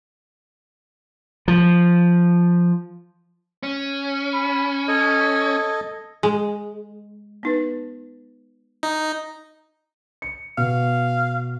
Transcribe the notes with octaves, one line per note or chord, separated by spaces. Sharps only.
F3
C#4
B5
A4 D#5 G#6
G#3
B3 D#4 B4
D#4
C#7
B2 F5